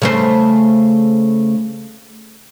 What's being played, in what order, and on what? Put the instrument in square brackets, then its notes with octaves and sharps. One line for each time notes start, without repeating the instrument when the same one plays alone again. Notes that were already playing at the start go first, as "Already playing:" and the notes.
[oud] C#3 A3 C5